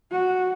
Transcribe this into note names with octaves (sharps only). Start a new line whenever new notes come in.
F#4